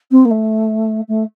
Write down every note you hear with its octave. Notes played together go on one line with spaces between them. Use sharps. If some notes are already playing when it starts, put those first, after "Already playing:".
C4
A#3
A3
A3